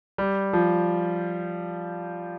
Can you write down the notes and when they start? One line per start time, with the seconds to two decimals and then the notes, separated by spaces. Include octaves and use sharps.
0.18 G3
0.53 F3